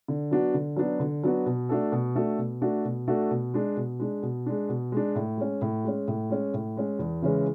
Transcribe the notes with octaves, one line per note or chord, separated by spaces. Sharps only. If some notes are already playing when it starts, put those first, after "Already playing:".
D3
F#3 B3 D4 F#4
D3
F#3 B3 D4 F#4
D3
F#3 B3 D4 F#4
B2
A3 D4 F#4 A4
B2
A3 D4 F#4 A4
B2
A3 D4 F#4 A4
B2
A3 D4 F#4 A4
B2
G#3 D4
B2
G#3 D4
B2
G#3 D4
B2
G#3 D4
A2
G#3 C#4
A2
G#3 C#4
A2
G#3 C#4
A2
G#3 C#4
E2
C#3 E3 G#3 C#4